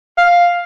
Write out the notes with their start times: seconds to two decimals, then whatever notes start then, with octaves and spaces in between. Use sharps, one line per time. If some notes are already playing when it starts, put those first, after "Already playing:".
0.18 F5